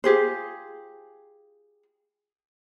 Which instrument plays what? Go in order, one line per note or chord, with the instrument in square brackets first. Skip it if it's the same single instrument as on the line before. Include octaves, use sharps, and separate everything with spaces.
[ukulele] F4 G4 G#4 C5